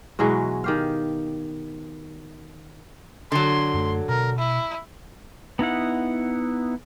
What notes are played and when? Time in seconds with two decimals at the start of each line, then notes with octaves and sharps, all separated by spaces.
0.19 B2 E3 F#3 G#3
0.64 D#3 G4 F5
3.32 D3 F#3 C6
3.74 F#2 A3
4.09 B2 A#4
4.38 E4
5.59 B3 D#4 E4 F#5